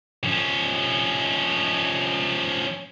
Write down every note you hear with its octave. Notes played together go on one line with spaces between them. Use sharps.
F3 C#4